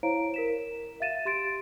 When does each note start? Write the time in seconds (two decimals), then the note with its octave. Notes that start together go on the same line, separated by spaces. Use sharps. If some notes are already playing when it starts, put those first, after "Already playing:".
0.03 E4 C5 C#5 F5 A#5 D7
0.34 A#4 B6 E7
1.00 E5 F5 A6 D#7 E7
1.25 G4 C6 A6 D7